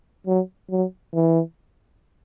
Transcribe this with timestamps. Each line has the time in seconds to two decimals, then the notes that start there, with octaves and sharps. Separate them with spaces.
0.27 F#3
0.71 F#3
1.14 E3